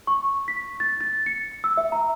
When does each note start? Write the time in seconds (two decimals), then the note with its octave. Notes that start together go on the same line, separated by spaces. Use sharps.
0.07 C#6
0.48 B6
0.80 A6
1.01 A6
1.26 C#7
1.64 E6
1.77 E5
1.92 A#5